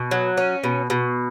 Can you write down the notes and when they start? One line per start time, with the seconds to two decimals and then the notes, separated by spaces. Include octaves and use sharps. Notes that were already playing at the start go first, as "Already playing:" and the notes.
Already playing: B2
0.11 F#3
0.37 C#4
0.64 B2
0.90 B2